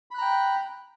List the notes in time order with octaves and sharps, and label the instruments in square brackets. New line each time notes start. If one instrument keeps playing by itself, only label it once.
[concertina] B5
F#6
A#5
G5